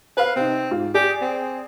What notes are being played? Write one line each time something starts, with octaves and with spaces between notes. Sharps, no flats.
B4 C5 F5
C3 C4 D#4
G#2 F4
G4 G#4 D5
C4